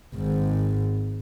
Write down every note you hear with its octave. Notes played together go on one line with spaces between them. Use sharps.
G#1 G#2